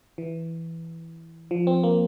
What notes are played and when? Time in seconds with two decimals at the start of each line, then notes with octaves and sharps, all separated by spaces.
0.18 E3
1.51 F3
1.67 C4
1.83 A#3